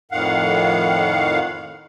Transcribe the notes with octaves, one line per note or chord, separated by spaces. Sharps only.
F2 A2 D#3 F5 F#5